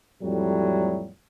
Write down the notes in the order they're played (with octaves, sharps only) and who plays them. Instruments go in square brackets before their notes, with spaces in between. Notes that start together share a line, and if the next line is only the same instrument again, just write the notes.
[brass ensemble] F2 A2 F#3 G3